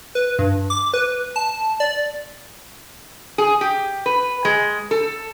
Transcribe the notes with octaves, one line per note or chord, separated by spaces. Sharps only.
B4
G2
D6
B4
A5
D5
G#4
G4
B4
G#3
A4